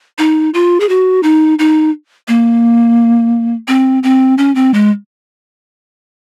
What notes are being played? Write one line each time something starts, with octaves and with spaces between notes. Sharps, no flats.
D#4
F4
G#4
F#4
D#4
D#4
A#3
C4
C4
C#4
C4
G#3